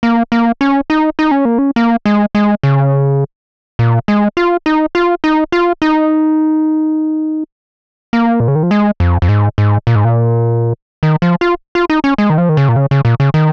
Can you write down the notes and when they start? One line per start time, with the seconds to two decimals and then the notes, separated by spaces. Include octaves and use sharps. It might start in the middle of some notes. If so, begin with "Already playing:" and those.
0.03 A#3
0.32 A#3
0.61 C#4
0.90 D#4
1.19 D#4
1.31 C#4
1.45 A#3
1.58 C#4
1.76 A#3
2.06 G#3
2.35 G#3
2.63 C#3
3.79 A#2
4.08 G#3
4.37 F4
4.66 D#4
4.95 F4
5.24 D#4
5.52 F4
5.82 D#4
8.13 A#3
8.40 A#2
8.48 C#3
8.55 D#3
8.63 F3
8.71 G#3
9.00 F2
9.22 F2
9.29 G#2
9.58 G#2
9.87 A#2
9.96 G#2
10.05 A#2
11.03 D#3
11.22 F3
11.41 F4
11.75 F4
11.90 D#4
12.04 C#4
12.18 G#3
12.30 D#3
12.38 F3
12.49 D#3
12.57 C#3
12.69 A#2
12.76 C#3
12.91 C#3
13.05 A#2
13.20 C#3
13.34 D#3